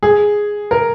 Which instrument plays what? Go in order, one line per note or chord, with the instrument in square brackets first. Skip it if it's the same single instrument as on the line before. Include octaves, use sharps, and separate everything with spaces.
[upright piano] G#4
A#4